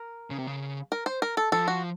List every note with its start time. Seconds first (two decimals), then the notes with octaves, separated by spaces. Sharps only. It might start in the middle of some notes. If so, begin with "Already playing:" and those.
Already playing: A#4
0.30 C#3
0.39 C3
0.47 C#3
0.92 A#4
1.06 C5
1.22 A#4
1.37 A4
1.52 F3 A4
1.68 F#4